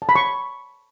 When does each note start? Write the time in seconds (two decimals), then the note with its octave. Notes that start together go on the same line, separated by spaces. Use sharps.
0.02 A5
0.09 B5
0.16 C#6